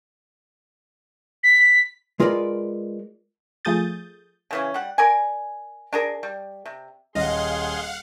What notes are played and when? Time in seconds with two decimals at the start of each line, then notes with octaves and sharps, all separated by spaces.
1.43 B6
2.20 G#3 F4 A#4 B4 D5
3.65 F3 A3 G#4 D#6 G6 A6
4.51 C#3 E3 C#4
4.74 G3 F#5
4.98 A#4 D5 G#5
5.93 D4 G#4 A#4
6.23 G3
6.66 C3
7.15 D#1 G#4 D#5 F5 F#5 C6